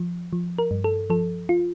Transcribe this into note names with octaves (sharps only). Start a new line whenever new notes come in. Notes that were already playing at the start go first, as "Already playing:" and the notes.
Already playing: F3
F3
A#4
G2
A4
F3 A4
F4